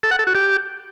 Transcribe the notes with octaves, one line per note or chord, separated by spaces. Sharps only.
A4
F#5
A4
F#4
G4